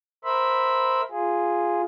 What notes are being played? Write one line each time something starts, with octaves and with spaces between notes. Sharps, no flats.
A#4 C5 E5 B5
F4 G#4